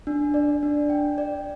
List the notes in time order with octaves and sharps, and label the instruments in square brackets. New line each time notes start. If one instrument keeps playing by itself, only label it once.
[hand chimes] D4
D5
D4
G5
D5